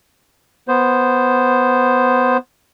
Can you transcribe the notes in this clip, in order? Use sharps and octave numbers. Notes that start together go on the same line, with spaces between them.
B3 C5